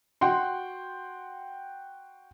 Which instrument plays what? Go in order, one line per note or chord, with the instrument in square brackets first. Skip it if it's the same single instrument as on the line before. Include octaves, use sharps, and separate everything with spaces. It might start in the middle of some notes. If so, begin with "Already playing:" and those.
[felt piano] F#4 F#5 G5 C6